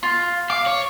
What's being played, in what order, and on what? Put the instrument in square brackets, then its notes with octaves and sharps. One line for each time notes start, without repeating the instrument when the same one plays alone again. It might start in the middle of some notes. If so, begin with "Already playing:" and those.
[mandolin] F4
[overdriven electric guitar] F5 [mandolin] D6
[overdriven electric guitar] C#5